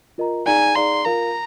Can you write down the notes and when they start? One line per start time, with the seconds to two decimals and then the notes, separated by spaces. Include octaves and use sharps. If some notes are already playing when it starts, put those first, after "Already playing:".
0.18 F4 A#4 D#5 A#5
0.47 D#4 G#4 D5 F5 G#5 A#5
0.75 D#4 G#4 D5 F5 A#5 C6
1.05 F4 A#4 F5 A#5